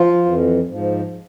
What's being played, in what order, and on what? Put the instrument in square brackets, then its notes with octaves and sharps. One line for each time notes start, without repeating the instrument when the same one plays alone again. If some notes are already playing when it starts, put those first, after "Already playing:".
Already playing: [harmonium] F3 F4
F2 E3
G#2 F3